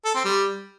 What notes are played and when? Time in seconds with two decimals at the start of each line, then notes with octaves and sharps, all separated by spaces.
0.05 A4
0.15 C4
0.25 G3